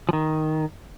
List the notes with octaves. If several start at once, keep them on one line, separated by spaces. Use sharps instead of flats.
F3
D#3